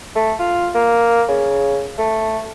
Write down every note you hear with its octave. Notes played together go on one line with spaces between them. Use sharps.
A3
F4
A#3
C#3
A3